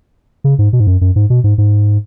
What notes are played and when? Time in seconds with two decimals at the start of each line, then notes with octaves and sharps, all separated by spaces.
0.44 C#3
0.59 G#2
0.73 B2
0.80 G#2
0.87 F#2
1.01 F#2
1.16 G#2
1.30 B2
1.44 G#2
1.58 G#2